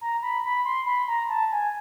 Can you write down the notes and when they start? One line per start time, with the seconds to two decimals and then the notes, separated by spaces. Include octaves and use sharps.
0.01 A#5
0.22 B5
0.45 B5
0.65 C6
0.87 B5
1.08 A#5
1.29 A5
1.52 G#5